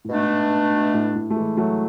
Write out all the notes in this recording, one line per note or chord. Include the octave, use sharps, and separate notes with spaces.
A2
G#2 B2 A3 D4
A2
A2
A3
E3 G#3
F#3 A3